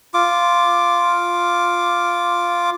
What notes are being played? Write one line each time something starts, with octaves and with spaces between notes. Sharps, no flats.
F4 D6